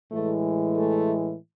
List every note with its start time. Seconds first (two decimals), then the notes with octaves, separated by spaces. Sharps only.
0.11 A2 E3 G#3 A3
0.73 A3